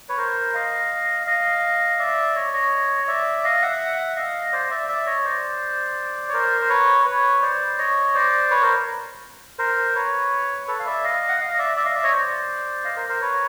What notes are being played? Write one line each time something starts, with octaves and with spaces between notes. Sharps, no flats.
B4 C#5
A#4 C5
D#5 F5
D#5 F5
D5 E5
C#5 D#5
C#5 D#5
D#5
D5 E5
D#5 F5
E5 F#5
D#5 F5
C5 D5
D5 E5
D5 E5
C#5 D#5
C5 D5
C#5
A#4 C5
C5
B4 C#5
B4 C#5
C5 D5
C#5 D#5
C5 D5
B4 C#5
A#4 C5
A#4 C5
B4 C#5
A4 B4
F5
D5 E5
D#5 F5
F#5
D#5 F5
D#5
D5 E5
D5 E5
D#5 F5
D5 E5
C#5 D#5
C5 D5
D#5 F5
A#4 C5
A#4 C5
B4 C#5